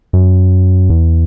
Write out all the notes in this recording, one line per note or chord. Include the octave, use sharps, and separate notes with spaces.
F#2
E2